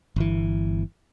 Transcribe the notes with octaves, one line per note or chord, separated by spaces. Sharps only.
G1 E3